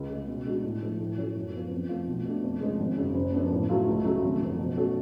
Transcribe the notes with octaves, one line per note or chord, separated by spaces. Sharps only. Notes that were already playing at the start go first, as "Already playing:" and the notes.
Already playing: C#2
C#3 G#3
B2
G#3 D4 F#4
A2
F3 A3
A2
F#3 C#4 F#4 A4
F#2
F3 B3 F4
F2
F3 A3 F4
B1
B2 A3 D4
F2
C#3 F3 G#3
G#1
F#2 C#3
F#1
F#2 F3 B3 D4
A2
F#3 A3 F4
C#2
C#3 F#3 A3
G#1
F#2 F3
B2
A3 C#4 F#4 A4